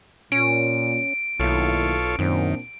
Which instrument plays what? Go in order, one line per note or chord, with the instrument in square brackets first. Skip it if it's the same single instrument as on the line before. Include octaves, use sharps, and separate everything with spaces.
[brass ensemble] A#2 [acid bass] C#4 [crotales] D7
[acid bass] B1 [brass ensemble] D#3 A#3 E4 [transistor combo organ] F4 A4 C#5
[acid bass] F#2 [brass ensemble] A#2 C4 D4 [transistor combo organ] D#3